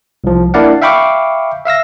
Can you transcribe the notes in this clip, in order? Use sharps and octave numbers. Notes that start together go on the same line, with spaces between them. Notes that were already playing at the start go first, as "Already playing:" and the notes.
C2 F3
A#3 D4 E4 D5 F5 F#5
E5 F5 G5 B5 C#6 D6
E5 F5 E6 A#6